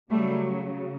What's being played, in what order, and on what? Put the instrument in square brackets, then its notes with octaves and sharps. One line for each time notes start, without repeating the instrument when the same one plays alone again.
[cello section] C#3 F#3 G3 A3